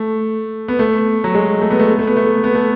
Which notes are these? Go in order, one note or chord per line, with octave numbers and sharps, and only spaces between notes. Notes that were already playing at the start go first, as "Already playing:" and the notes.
Already playing: A3
B3
A3
F#3
G#3
A3
B3
A3
B3
A3
B3
A3
B3
A3